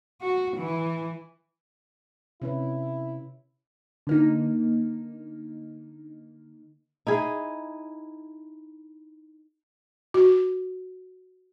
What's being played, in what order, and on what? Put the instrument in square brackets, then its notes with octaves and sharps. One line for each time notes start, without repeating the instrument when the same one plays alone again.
[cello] F#4
E3
[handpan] C3 C#4 B4 [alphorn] E4
[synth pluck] D3 A#3 D#4
[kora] D#4 E4 G#4
[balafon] F#4